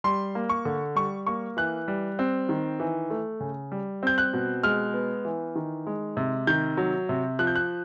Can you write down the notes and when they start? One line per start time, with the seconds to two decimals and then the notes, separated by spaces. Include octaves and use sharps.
0.04 G3 C6
0.35 A#3
0.49 C#6
0.65 D3
0.95 G3 C#6
1.27 A#3 C#6
1.57 E3 F#6
1.88 G3
2.19 C4
2.49 D#3
2.80 E3
3.10 A3
3.40 C#3
3.72 G3
4.03 C4 G6
4.18 F#6
4.33 B2
4.63 G#3 F6
4.94 B3
5.25 E3
5.56 D#3
5.87 G#3
6.17 C3
6.47 D#3 G6
6.77 F#3
7.09 C3
7.39 F3 F#6
7.47 G6
7.56 F#6